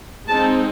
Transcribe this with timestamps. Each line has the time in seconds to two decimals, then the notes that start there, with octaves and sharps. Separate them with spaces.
0.27 G#3 C4 D#4 A5